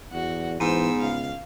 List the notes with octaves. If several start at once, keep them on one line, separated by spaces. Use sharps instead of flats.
E2 F#4
G#2 E3 B3 C5 E6
C#2 F5